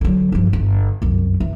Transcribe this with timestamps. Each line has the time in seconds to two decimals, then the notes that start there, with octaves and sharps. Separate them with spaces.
0.01 D3 F#3
0.32 G2 F3
0.53 G1
1.02 C2 F#2
1.40 E3